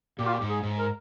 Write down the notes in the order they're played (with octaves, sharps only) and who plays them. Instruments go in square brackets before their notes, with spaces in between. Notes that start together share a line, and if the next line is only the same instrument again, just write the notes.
[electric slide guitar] A#2 [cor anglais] G4
[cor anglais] F4
G4
[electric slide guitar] G#2
[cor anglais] G#4
[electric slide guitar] G#2
[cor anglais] A#4